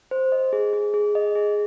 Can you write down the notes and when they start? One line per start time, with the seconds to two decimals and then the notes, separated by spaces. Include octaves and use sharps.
0.11 C5
0.32 D#5
0.53 G#4
0.73 G#4
0.94 G#4
1.15 D#5
1.35 G#4